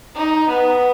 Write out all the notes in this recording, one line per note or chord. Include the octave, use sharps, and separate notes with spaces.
D#4
B3